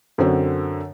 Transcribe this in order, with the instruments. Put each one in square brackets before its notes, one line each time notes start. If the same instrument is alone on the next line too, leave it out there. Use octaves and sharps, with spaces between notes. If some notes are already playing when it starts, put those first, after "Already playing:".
[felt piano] F#2 D3 C4 F#4